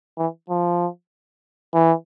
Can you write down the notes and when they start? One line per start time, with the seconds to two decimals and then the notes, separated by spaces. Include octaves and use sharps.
0.18 E3
0.50 F3
1.74 E3